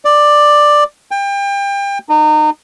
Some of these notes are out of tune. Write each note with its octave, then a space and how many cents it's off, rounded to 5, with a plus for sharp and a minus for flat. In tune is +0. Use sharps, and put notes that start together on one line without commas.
D5 +10
G5 +30
D#4 -30